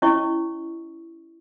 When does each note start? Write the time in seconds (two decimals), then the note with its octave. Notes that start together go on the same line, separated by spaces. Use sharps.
0.02 C#4 E4 C#5 D#5 C#6